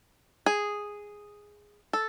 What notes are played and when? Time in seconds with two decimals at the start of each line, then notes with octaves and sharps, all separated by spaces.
0.46 G#4
1.93 A4